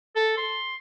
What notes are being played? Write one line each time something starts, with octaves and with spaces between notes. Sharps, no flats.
A4
C6